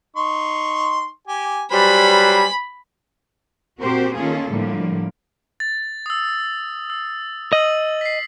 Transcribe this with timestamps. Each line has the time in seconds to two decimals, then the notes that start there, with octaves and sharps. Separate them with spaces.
0.16 D#4 C6 C#6
1.27 G4 G#5
1.71 F#3 G3 B4 C5 G#5 B5
3.80 A#2 C4 F#4 G4 A#4 C5
4.16 D#3 A#3 C#4 F4 G#4 A4
4.50 A2 D3 F3 G3 A#3
5.60 A6
6.06 D#6 E6
6.90 E6
7.53 D#5 E6 F#7
8.01 B6 C7